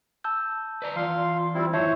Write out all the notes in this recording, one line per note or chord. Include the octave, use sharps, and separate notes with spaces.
A5 E6 G6
B4 D5 A#5
E3 F4 D5 F5 C6
G3 C4 E4
F#2 D#3 E4 C5 C#5 E5 A5